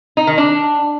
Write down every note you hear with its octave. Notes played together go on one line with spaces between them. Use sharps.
D#4
D#3
D4